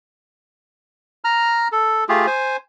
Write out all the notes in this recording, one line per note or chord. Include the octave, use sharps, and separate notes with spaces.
A#5 F6
A4
A3 F4 G4 G#4
C5 G#5